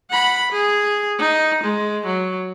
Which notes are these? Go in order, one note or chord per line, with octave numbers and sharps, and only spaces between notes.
F#5 B5
G#4
D#4
G#3
F#3